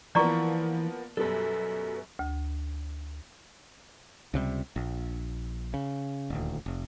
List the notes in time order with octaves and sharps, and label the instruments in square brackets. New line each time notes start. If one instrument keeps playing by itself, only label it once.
[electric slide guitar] E3 [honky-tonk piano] F3 A#3 B3 [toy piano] D5 A#5 C#6
[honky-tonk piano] F#2 B2 G3 [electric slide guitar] A4 B4
[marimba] D2
[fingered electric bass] C#2 C3 F#3 G3
A#1
C#3
D#1 D2
F1